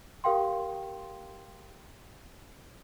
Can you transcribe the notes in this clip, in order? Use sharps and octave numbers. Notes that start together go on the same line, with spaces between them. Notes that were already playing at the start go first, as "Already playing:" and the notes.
G4 A#4 F5 G5 C6